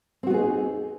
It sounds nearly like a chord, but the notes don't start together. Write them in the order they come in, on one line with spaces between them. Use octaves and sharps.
C4 F#4 B3 G#4 D#4